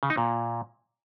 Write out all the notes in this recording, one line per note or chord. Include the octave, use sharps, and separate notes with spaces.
C#3
D#4
A#2